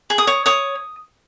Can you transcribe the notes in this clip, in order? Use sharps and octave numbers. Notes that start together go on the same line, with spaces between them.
G#4
D#6
C#5
C#5 D#6